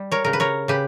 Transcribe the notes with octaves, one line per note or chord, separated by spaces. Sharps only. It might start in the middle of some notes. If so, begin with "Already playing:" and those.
Already playing: G3 G4
A#4 C#5
C#3 A#4
B4
A#4 C#5
C#3 G4 B4